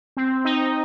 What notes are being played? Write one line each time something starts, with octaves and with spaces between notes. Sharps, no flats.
C4
D#4